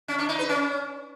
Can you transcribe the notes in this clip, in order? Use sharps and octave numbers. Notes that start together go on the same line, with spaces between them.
C#4
D4
D#4
B4
C#4